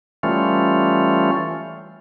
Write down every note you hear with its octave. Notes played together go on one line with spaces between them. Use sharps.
E3 G3 A3 C#4 F4